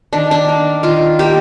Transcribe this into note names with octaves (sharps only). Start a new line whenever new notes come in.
D#3 D4
D4
A#3
D#3 F4
A#3 G4